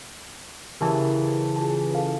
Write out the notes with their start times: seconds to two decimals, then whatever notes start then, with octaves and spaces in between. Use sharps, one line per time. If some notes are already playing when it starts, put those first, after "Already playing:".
0.81 C#3 E3 G4 A#4 A5
1.56 F4 G#4 A5
1.95 A4 F5